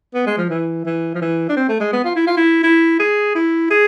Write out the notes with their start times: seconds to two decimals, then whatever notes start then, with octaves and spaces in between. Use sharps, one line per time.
0.14 B3
0.27 G#3
0.38 F3
0.50 E3
0.85 E3
1.14 F3
1.21 E3
1.49 D4
1.57 C4
1.69 A3
1.80 G#3
1.93 B3
2.04 F4
2.16 E4
2.27 F4
2.37 E4
2.64 E4
2.99 G#4
3.35 E4
3.71 G#4